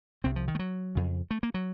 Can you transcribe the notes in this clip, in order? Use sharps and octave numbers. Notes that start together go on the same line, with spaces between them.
C2 C3 C4
F3
D#3
A3
F#3
F2 C#3
A3
A#3
F#3